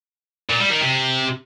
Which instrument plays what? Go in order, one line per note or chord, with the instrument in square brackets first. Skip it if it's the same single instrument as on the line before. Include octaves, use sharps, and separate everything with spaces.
[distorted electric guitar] A#2
G3
D#3
C3